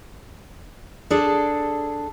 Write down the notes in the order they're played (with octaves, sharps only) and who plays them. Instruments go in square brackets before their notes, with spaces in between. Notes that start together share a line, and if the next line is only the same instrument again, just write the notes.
[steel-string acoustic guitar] D4 G#4 A4 D5